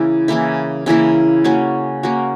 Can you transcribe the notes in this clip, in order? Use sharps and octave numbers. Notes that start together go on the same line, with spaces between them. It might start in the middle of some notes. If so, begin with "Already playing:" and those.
Already playing: C#3 E3 A#3 E4
C#3 E3 A#3 E4
C#3 E3 A#3 E4
A#3 C#4 F#4
A#3 C#4 F#4